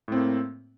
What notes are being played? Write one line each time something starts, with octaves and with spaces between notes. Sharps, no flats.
A2 A#3 C4